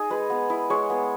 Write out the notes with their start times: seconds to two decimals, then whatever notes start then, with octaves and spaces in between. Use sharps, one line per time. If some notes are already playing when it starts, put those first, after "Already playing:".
Already playing: D#4 G#4
0.10 G#3 B4
0.30 B3
0.50 E4
0.70 G#3 C#5
0.90 B3